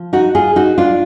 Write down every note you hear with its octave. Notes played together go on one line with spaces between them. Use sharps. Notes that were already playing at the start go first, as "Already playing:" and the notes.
Already playing: F3
D#4 F#4
F4 G#4
D#4 F#4
D4 F4